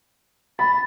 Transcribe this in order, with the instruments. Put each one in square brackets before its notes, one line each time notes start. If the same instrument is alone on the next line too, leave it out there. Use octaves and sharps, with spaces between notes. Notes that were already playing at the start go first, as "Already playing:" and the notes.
[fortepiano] B5 [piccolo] A6